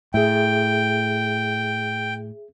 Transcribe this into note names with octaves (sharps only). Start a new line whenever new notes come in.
A2 G#4 E5 G5